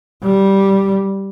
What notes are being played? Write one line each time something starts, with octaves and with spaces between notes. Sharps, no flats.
G3